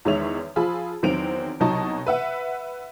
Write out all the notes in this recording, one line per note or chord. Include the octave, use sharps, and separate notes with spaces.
E2 D#3 G#3 C#5 E5 F7
F3 F4 G#4 B5 E6
E2 D#3 F#3 C4 D7 F7
C2 B2 F#3 D#4 A5 C#6
B4 E5 F#5